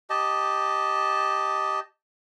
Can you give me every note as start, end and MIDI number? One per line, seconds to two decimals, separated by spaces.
0.10 1.80 67
0.10 1.80 75
0.10 1.80 81